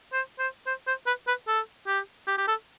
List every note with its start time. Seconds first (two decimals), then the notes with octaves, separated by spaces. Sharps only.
0.13 C5
0.39 C5
0.67 C5
0.87 C5
1.06 B4
1.27 B4
1.47 A4
1.87 G4
2.27 G4
2.38 G4
2.48 A4